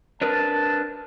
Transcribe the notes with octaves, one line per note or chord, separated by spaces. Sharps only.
D4 A#4 B4 A5